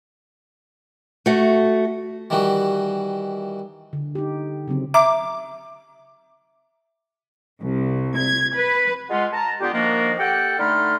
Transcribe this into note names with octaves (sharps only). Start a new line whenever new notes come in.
A3 F#4
D#3 E3 G3 F#4
D3
D#4 G4
C#3 F#3 C4
E5 A#5 D6
C2
G#6
B4
G#3 F4 F#5
A5 A#5
D3 B3 F4 G4
D#3 F3 A#3 D4 F#4 A#4
G4 A4 F#5 G5
D3 A3 D#4 B5 C6 F6